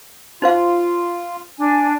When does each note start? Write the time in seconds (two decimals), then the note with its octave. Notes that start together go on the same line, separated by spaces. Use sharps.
0.42 D#4 F4 C5 F5
1.58 D4 G#5